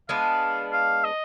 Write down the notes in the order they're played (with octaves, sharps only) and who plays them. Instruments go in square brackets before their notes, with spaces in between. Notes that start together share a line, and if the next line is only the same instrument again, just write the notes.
[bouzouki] G#3 B3 D4 [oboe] F5
[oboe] F5
D#5